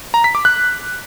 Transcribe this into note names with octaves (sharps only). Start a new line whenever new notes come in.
A#5
B6
D6
F#6